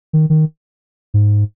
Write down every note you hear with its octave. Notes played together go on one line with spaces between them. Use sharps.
D#3
D#3
G#2